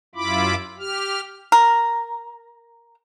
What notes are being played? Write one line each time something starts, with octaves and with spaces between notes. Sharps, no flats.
F#2 E4 F4 B5 D6
G4 F6
A#4